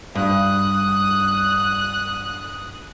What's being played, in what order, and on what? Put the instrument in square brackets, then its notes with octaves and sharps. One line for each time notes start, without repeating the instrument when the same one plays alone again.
[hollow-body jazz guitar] G2 [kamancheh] D#6 F#6